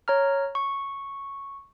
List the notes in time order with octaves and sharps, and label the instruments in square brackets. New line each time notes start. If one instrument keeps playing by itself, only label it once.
[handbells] C#5 A#5 F6
C#6